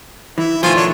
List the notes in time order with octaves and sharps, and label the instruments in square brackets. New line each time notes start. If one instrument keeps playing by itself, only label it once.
[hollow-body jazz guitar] E3 [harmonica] E4
[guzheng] B2 D#3 A3 [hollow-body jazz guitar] F3 [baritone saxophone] F4 [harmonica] C5 G#5
[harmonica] D4 C#5 D5